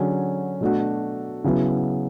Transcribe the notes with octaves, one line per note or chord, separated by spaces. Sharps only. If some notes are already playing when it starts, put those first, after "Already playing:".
Already playing: D3 F#3 C#4 G#4
B2 A3 D4 F#4
C#3 F#3 B3 E4